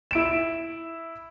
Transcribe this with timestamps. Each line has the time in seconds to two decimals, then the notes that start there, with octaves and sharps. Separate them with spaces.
0.11 E4 D7 E7